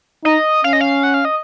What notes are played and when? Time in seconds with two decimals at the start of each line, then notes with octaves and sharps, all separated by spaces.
0.24 D#4 D#5
0.64 C#4 F5
0.73 D#5
0.81 F5
1.03 F#5
1.14 F5
1.25 D#5